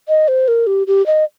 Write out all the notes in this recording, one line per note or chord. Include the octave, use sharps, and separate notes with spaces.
D#5
C5
A#4
G4
G4
D#5